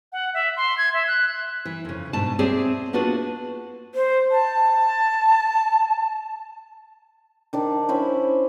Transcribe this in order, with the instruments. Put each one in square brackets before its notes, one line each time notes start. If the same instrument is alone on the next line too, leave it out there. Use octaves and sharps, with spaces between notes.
[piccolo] F#5
E5
C6
G#6
E5
F#6
[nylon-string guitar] E3
F2 C#3
G#2 B2 D4 A5
C4 G#4 C#5 D5 E5 A5
A#3 B3 D4 F4 F#4 B4
[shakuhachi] C5
A5
[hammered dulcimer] D#3 D4 D5
C#4 E4 C5 B5